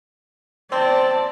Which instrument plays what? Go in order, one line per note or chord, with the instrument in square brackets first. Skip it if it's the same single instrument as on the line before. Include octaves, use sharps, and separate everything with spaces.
[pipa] C4 [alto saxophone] C5 [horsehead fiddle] D5 A5